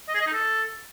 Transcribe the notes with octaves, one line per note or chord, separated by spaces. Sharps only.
D#5
G#4
D#5
D#4
A4